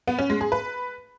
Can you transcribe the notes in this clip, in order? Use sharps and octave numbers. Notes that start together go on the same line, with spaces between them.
B3
C#4
G#3
G#4
B4